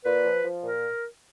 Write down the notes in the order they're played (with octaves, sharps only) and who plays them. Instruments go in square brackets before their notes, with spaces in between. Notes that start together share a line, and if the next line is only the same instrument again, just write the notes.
[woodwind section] A#2 B4
F3
F3
A#2 A#4